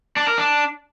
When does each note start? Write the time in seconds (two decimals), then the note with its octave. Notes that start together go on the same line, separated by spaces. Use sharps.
0.17 D4
0.27 A#4
0.38 D4